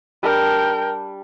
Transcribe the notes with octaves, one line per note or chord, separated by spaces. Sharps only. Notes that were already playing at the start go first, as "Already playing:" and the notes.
G3 D4 A#4 G5